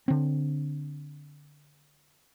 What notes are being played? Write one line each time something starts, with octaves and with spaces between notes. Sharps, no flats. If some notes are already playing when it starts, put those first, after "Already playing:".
D3 C4